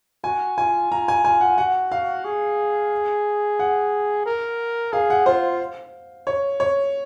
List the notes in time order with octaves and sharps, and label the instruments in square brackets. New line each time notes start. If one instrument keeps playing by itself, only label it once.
[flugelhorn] F#4 [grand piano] G#5
[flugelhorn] F4 [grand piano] G#5
[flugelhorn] F4 [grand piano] A#5
[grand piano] G#5
[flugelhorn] F4 [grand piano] G#5
[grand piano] F#5
[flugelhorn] F#4 [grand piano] F#5
[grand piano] F5
[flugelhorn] G#4
[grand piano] F#5
[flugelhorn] A#4
[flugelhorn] G#4 [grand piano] F5
[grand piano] F#5
[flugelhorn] F4 [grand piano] C5
[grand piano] C#5
C#5